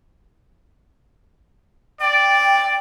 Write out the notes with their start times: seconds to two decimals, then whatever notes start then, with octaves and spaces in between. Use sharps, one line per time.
2.01 D5 G5